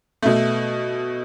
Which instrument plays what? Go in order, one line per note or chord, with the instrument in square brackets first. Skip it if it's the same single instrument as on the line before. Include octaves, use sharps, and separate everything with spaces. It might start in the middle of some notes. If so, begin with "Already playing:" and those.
[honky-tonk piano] B2 A3